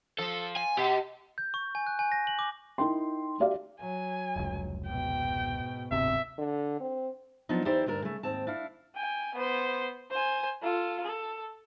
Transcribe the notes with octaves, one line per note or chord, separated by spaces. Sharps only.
F3 A4
G#5
B2 G4
G6
C#6
G#5
F#6
G#5
A#6
F#7
D6
D#4 E4 A#4 G5 C6
F#4 G4 D5 E5 F5
F#3 G#5
F1 C#2
G#2 B2 G5
D1 G1 C3 E5
D3
C4
F3 F#3 B3 D4 D#4
E2 D#4 E4 G4 C5 D5
D2 G2 D4 A#4
C#3 A3
D#2 G#2 C4 A5
D4 E4 F5
G5 G#5
B3 C5
C5 G#5
F4 A4
A4